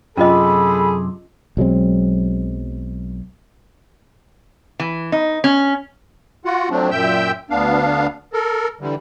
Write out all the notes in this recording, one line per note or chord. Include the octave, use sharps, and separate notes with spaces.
F#2 C3 C#4 F4 G#4 A4 D#5 B5
B1 F#3 G#3 C4
E3
D#4
C#4
F4 F#4 F#5
F3 F#3 A3 C4 D4
F#2 A#2 E5 G5 E6 G6
D2 B3 D4 F5
A4 A#4
D3 E3 G3